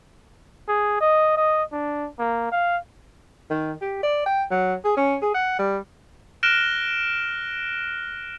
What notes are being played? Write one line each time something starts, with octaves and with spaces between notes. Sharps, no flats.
G#4
D#5
D#5
D4
A#3
F5
D#3
G4
D5
G5
F#3
G#4
C#4
G#4
F#5
G3
F6 F#6 A#6 D7 E7 G7